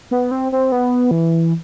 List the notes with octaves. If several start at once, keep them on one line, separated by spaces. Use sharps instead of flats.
B3
C4
C4
B3
E3